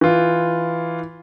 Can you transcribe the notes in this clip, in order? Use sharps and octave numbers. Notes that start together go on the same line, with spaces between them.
E3 F4